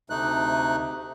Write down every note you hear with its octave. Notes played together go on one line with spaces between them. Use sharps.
D2 C3 A3 D#4 F#6